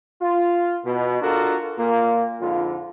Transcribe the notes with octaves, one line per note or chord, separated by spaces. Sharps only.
F4
B2
D4 F4 F#4 A4 A#4
A#2 A#3
F2 G#2 D3 F4